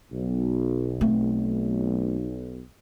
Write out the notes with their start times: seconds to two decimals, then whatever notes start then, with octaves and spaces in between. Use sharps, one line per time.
0.12 B1
1.01 A3 C4